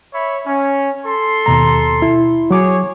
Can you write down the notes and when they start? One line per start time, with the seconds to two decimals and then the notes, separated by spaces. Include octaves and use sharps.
0.13 C#5 E5 B5
0.47 C#4
1.05 A4 C6
1.46 D#2 B2 A#5
2.02 E4
2.51 F#3 G#4 C#5 D6